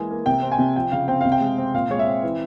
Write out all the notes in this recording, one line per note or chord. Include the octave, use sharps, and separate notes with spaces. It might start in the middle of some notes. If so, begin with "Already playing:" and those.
Already playing: E3 G#3 A#3 G#5
A#3
C3 G5
C4
G#5
C3
F3 G5
C#3 F5
C4 G5
C3 F5
G5
G#3
C4
A#2 F5
G#3 C#5
E5
C4
E3